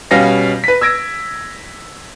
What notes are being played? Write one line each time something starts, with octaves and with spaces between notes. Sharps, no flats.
B2 G3 B3 C#4 F5 A#6
B4 B6
E6 G#6 A#6 D7